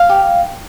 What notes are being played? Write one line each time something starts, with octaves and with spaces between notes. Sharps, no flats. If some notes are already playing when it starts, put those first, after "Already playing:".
Already playing: F5
G4